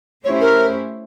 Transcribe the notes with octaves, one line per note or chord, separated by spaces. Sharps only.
A3 C#4 E4 G4 C5 C#5
A#4